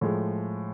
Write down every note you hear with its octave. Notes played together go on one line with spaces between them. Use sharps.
A2 F3 G#3